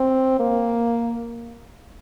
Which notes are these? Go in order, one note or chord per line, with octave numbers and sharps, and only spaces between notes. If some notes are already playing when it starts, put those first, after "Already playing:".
Already playing: C4
A#3